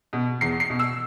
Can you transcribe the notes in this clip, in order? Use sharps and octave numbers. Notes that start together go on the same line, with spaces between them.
B2
E2 C7
C7
B2
E6